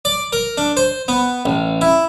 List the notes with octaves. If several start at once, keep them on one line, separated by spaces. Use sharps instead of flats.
D5
A#4
D4
C5
B3
A1
E4